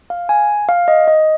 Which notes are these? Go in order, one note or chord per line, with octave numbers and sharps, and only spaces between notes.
F5
G#5
F5
D#5
D#5